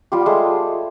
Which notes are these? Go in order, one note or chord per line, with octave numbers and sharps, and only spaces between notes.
G3 F4 G4
G#3 A3 G#4